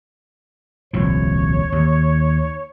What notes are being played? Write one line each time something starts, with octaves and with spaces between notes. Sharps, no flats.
D#1 C2 F3 C#5
D#2